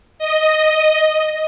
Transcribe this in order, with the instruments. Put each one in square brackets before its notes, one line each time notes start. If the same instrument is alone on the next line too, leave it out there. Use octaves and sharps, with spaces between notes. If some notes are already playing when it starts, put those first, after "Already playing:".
[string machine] D#5